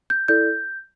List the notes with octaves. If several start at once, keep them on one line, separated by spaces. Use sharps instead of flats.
G6
E4 A4 D5 G6